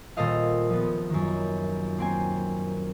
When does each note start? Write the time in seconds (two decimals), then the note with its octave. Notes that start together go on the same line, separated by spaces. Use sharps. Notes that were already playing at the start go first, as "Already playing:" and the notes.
0.17 D#1 A#2 A4 C5 D#5 F5
0.70 F3 B3
1.10 F#2 D#3
1.98 A#3 C4 G#5